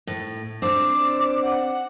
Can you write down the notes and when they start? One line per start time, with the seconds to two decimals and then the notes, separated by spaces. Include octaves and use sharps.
0.07 A2
0.62 C4 D4 D6
1.43 F#5